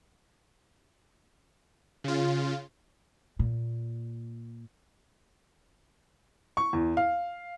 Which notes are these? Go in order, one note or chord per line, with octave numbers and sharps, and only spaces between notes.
C#3 F4
A#2
C#6
E2
F5